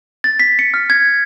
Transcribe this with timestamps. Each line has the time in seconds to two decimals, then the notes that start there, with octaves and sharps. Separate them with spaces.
0.24 A6
0.40 B6
0.59 C#7
0.74 F6
0.90 G#6